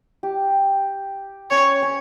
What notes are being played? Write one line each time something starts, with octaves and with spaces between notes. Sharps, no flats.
G4
C#4 C#5
C#4